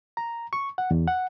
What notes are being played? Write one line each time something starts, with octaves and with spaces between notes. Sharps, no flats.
A#5
C#6
F#5
E2
F#5